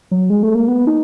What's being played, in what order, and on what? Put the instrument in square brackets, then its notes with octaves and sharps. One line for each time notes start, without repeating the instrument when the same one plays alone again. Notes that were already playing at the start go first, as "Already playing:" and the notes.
[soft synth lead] F#3
G#3
A3
A#3
B3
D#4